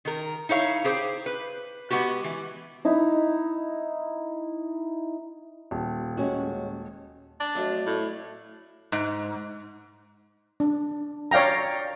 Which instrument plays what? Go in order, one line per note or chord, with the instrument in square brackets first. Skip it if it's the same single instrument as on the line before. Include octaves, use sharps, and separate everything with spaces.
[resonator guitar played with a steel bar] D#3 A#4
D#4 E4 C#5 F5
G4 G#4 C5
B4
G#3 B3 C#4 F#4 G4
E3
[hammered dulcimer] D#4 E4
[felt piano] D#1
[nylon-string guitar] G#3 C#4 F#4
[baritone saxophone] D4
[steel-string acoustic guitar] F2 F#3 A3
[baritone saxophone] A2
[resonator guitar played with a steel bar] G#2
[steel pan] D4
C#5 D5 F5 G5 A#5